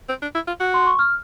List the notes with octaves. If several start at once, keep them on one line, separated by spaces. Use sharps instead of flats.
C4
D4
E4
F4
F#4
C6
C#6
F6